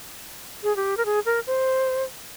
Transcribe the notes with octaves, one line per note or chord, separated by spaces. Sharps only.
G#4
G4
A#4
G#4
A#4
C5